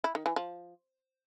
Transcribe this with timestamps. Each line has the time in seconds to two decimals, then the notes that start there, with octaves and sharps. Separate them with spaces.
0.04 E4
0.15 D#3
0.26 E3
0.36 F3